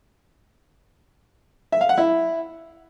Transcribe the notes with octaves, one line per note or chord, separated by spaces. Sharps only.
E5
F5
F#5
E4